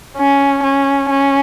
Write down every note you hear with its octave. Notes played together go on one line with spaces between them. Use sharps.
C#4
C#4
C#4